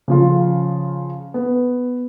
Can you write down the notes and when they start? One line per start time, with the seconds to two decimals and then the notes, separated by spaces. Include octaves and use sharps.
0.08 C#3 F3 F4
1.34 B3